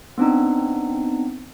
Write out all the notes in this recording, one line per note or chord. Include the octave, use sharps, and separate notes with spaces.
B3 C4 D4 D#4